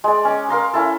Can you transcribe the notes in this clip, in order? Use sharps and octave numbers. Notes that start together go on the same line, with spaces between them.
G#3 D5
C#4 D6
A#4 F5 A#5 C6
C#4 E4 A4